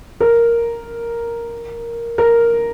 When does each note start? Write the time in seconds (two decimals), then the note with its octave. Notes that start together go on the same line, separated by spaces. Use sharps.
0.20 A#4
2.18 A#4